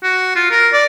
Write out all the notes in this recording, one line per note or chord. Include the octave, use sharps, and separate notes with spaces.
F#4
F4
A#4
D5